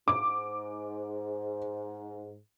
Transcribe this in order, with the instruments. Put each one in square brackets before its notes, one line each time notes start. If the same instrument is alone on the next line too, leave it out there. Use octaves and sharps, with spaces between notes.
[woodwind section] G#2 [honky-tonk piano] D6